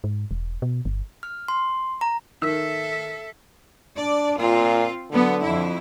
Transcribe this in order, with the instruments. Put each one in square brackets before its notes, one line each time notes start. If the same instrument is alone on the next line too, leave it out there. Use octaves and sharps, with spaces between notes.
[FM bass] G#2
E1
B2
G1
[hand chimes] F6
C6
A#5
[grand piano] D#3 E6 [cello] A4 E5
[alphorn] D4 [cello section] D5
[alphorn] A#2 [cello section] C4 F4
[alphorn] D3 [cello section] F#3 B3
[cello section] F2 E4